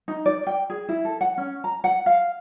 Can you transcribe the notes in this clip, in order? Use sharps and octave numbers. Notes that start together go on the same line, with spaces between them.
D#4
D5
G5
G#4
E4
A4
F#5
C#4
A#5
F#5
F5